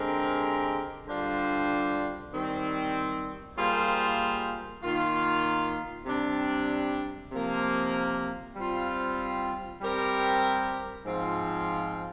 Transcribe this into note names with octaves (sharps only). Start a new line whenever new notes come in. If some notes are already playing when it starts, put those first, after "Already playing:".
Already playing: D3 G#3 C4 G4 A#4
D3 G3 D4 F4 C5
D#3 G3 C4
G3 A#3 F4 G#4 C5
D#3 A#3 F4
C3 G3 D4
C3 F3 A#3
G3 C4 F4
G3 C4 G4 A#4
G#2 F3 C4 F4